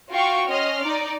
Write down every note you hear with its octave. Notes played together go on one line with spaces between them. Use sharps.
F4 F#4 F5 G5 C#6
C#4 D#5 C6 F6
D#4 D5